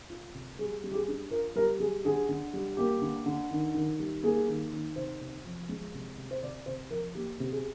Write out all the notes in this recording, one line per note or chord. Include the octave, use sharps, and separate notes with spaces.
F4
C3
G3 G#4
G3
G4
G#4
D4
F4 A#4
G3 A#4
G3 G#4
D3 G#4
D3
G3
A#3 G4
D3
D3
D#3
D#3
G3
A#3 G#4
D#3
D#3
C3 C5
C3
F3
G#3
C3
C3
C5
C3 D5
C3 C5
F3 A#4
A#3 G4
C3
G#4